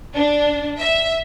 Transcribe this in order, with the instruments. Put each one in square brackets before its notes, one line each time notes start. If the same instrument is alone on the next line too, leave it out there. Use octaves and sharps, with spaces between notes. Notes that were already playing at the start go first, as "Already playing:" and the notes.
[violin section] D4
E5